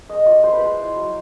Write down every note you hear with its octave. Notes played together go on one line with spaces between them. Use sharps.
G#3 D#5
F4 D5
G#3 C5
B4
G#3 C5
E4
F#3